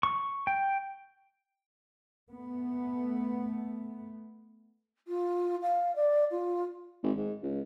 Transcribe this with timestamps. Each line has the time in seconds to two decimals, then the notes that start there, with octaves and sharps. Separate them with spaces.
0.03 C#6
0.47 G5
2.30 A3 B3
5.08 F4
5.62 F5
5.96 D5
6.31 F4
7.03 G#1
7.17 G#2
7.42 C#2